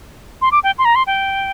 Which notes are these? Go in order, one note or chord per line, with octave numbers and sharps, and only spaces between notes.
C6
D6
G5
C6
A#5
C6
G5